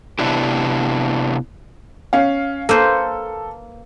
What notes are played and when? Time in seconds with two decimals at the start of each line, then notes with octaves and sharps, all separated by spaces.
0.19 C3 B3 D4 E4 G4
2.13 C#4 F5
2.69 A#3 A4 B4 C5